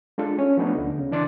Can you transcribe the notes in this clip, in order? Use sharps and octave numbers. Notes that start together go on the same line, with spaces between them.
G#3 D4 F4 A4
C#4
F3 A3 B3 D4 D#4
D2 D3
C#3
E3 D4 D5 C6 A6